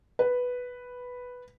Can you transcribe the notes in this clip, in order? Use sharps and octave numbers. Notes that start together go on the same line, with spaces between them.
B4